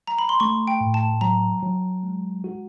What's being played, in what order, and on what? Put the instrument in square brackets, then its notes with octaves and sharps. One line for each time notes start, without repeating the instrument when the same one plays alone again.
[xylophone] A#5
B5
C6
[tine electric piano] A3 [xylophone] C#6
[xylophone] G5
[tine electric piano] A2
[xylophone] A5
[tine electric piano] F#3 [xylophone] A#5
[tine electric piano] F#3
G#3
F#4